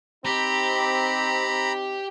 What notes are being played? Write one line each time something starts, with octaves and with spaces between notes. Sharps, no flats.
C4 D#4 G4 A#5 B5